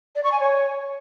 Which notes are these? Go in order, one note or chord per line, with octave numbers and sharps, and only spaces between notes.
D5
C#6
G#5
C#5